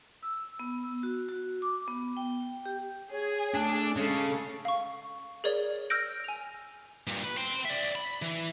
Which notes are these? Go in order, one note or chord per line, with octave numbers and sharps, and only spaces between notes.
E6
B3
E6
F#4
F#4
D6
B3
G5
G4
G#4 C#5
A3 D4
C#3 G#3 A4
F5 C#6
G#4 A#4 C#5 D5
E6 F6 G6 A#6 D7
G#5 F7
G2 A#2
B4
G5 C6
D5 E5
B5
E3